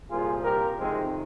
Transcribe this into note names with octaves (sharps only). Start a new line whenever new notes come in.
C2 A#2 F3 F4 G#4
G4 A#4
F2 C3 D#3 G#3 C4